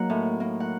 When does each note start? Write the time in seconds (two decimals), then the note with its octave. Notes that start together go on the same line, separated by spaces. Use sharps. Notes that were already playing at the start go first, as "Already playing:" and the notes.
Already playing: F#3 A#3 D#4 F#5
0.10 A2
0.40 A#3
0.60 F#5